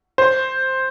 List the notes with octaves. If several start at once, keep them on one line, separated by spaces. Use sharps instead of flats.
C5